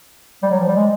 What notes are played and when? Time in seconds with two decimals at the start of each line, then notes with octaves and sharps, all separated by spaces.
0.43 G3
0.51 F#3
0.59 F3
0.67 G3
0.76 G#3